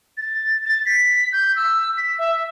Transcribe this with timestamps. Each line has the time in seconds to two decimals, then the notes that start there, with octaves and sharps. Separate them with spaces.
0.18 A6
0.65 A6
0.86 B6
1.33 G6
1.56 E6
1.98 B6
2.19 E5